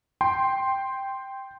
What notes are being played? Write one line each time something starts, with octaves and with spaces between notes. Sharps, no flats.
G5 C6